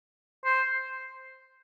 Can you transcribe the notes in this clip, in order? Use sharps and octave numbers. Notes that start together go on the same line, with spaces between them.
C5